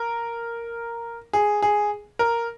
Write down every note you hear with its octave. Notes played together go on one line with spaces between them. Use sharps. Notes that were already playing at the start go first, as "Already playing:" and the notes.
Already playing: A#4
G#4
G#4
A#4